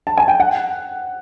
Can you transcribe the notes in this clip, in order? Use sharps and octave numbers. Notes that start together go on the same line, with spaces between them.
A5
G#5
G5
F#5